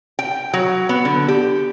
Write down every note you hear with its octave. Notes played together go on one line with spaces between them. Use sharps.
G5
F#3
B3
D3
G4